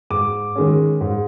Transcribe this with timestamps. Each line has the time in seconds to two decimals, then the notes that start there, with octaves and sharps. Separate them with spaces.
0.10 G#2 D6
0.56 D#3 G#3 C#4
1.01 G#2